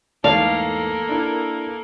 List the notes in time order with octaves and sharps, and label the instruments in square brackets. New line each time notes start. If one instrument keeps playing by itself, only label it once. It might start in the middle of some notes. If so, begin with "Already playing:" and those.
[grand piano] E2 G#2 A3 [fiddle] A#3 A4 [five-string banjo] D5 A5 [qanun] F5
[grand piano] D4 E4 A#4